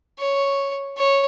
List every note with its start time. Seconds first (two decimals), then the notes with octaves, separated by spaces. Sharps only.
0.19 C#5
0.97 C#5